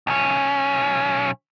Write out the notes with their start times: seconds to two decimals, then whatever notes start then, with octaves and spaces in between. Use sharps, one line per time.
0.07 B1 C#4